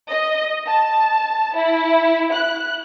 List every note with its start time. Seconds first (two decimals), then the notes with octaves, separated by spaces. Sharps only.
0.10 D#5
0.67 A5
1.56 E4
2.33 F#6